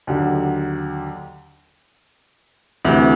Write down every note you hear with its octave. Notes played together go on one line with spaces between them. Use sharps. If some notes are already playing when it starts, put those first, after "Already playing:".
D#2 D3 F#3
D2 C3 E3